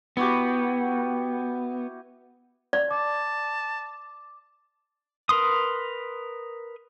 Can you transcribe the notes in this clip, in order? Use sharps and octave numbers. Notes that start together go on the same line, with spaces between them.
B3 E4 F#4 G4
D5
A5 D6
A#4 B4 C6 D#6